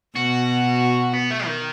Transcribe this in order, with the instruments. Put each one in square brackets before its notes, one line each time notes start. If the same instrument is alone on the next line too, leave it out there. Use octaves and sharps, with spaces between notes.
[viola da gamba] B2 [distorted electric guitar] F#4
[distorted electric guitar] B3
A3
D#3